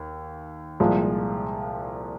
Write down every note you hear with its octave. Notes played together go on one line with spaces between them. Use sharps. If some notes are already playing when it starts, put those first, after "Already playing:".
Already playing: D#2
C2 A#2 F3 G#3